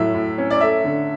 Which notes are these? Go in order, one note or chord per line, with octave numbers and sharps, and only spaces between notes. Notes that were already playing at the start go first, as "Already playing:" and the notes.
Already playing: A2 F#3 E5
A2
C#4
D5
A3 E5
D3